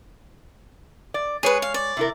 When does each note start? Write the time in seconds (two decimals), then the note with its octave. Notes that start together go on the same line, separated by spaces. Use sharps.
1.14 D5
1.43 G#3 G#4 B4 C#5
1.62 F5
1.74 D5
1.97 C3 E4 A#4